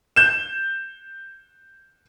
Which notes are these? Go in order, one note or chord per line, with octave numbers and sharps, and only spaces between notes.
G6 E7